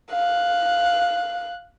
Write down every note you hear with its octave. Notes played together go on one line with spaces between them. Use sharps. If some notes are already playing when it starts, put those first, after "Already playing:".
F5 F#6